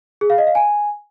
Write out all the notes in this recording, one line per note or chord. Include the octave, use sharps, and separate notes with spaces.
G#4
F5
D#5
F5
G#5